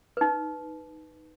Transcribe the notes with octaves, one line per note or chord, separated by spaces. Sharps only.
D#4 B4